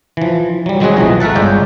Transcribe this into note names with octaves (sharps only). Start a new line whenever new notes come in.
E3 F3
F#3 G3
D#3 F#3 G#3 C4 F#4 G#4
B1 E3 F3 D#5
A3 A#4 E5 F#5 A5
G1 G#3 F4 C#5 D5 G5